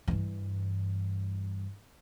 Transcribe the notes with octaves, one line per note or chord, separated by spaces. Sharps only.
G2 E3